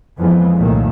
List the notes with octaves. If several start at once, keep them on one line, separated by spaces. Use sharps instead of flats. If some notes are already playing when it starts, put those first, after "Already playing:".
F2 E3 F3 G#3 B3
C2 F#2 A#2 D#3 A3